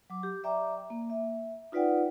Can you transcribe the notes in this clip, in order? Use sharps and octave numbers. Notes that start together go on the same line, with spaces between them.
F#3 D6
G4
D5 E5 G5 A#5 D6
A#3
E5
D#4 F4 B4 D5 F#5 G5